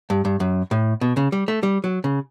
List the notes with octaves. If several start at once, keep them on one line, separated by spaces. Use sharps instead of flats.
G2
G2
F#2
A2
B2
C#3
G3
A3
G3
F#3
C#3